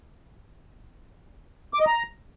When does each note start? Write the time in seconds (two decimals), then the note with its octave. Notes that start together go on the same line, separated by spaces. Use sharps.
1.74 D6
1.80 D#5
1.87 A#5